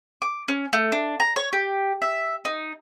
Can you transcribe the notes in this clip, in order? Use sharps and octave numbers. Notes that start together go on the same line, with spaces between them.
D6
C#4
A3
D4
A#5
C#5
G4
E5
D#4